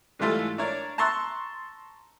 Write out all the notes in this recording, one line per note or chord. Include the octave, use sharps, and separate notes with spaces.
G#2 E3 G3 A3 F4 A4
D4 A#4 C#5 D5
A5 A#5 C6 C#6 E6 F#6